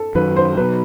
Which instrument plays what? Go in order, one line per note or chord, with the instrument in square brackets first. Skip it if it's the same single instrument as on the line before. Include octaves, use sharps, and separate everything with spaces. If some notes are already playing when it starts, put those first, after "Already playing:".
Already playing: [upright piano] A4
[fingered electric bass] F#2 D#3 F#3 [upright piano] B4
[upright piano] C5
[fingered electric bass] B2 F#3 [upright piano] B4